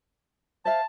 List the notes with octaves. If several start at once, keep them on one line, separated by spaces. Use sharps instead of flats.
C5 E5 F5 A5